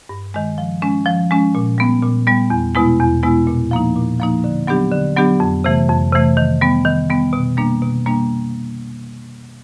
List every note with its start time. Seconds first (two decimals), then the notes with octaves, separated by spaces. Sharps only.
0.09 G2
0.34 D#3 G#3
0.58 F3
0.82 G#3 C#4
1.06 F3
1.31 G#3 C#4
1.55 A#2
1.78 G3 B3
2.03 A#2
2.27 G3 B3
2.50 E2
2.75 B2 G#3 B3 E4
3.00 E2
3.23 B2 G#3 B3 E4
3.47 A#2
3.71 F3 A#3 D#4
3.96 A#2
4.20 F3 A#3 D#4
4.44 D3
4.67 F#3 B3 D4 G4
4.92 D3
5.16 F#3 B3 D4 G4
5.40 F2
5.64 C3 E3 A3
5.89 F2
6.12 C3 E3 A3
6.37 D#3
6.61 G3 B3
6.85 D#3
7.10 G3 B3
7.33 B2
7.57 G3 A#3 D4
7.82 B2
8.06 G3 A#3 D4